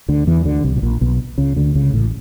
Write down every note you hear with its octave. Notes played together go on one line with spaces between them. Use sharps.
D2 D3
E2 E3
D2 D3
C2 C3
B2
A#1 A#2
B1 B2
C#2 C#3
D2 D3
C#2 C#3
A1 A2